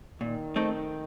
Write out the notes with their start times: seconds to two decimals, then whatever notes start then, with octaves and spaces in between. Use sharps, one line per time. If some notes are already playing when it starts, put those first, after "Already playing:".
0.20 A#2 D#3
0.56 A3 C4 D#4